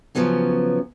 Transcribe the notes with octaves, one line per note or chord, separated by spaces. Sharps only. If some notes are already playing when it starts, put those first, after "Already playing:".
C#3 F3 F#3 B3 C#4